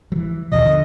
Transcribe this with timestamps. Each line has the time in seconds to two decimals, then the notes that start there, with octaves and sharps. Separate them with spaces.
0.12 E3 F#3
0.52 D#2 B2 F3 D#5
0.65 D3